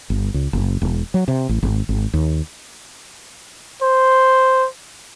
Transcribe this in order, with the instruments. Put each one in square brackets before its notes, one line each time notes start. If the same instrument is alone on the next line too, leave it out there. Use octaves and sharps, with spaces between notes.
[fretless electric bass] G1
C#2
F#1
E1
F#3
C3
A1
G#1
G#1
D#2
[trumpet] C5